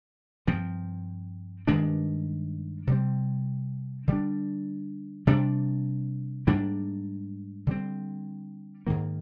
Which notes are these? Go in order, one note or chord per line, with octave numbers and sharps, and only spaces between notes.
G2 F3 C4
G2 D#3 G#3 D4
C3 G3 C4
D3 G3 D4
C3 G3 D4
G#2 G3 A#3 D4
D3 G3 C4
G#2 D#3 A#3